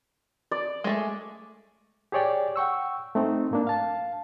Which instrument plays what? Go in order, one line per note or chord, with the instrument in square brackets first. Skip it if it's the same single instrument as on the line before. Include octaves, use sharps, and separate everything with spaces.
[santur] D5
[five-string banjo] G#3 A3
[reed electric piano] G4 G#4 C#5 D5 G5
F#5 G5 C#6 E6
A3 C4 D#4
G#2 A#3 D4
F5 A5